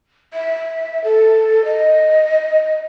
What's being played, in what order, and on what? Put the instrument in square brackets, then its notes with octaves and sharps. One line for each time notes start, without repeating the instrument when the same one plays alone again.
[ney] E5
A4
D#5